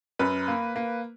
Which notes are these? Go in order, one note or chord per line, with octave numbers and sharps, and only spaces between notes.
F#2 B4
A#3
A#3